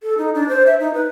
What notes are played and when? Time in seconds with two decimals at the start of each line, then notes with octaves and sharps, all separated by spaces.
0.03 A4
0.18 D#4
0.35 D4
0.49 C5
0.66 E5
0.80 D#4
0.94 B4